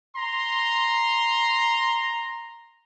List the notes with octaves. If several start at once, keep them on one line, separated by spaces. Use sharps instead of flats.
A#5 C6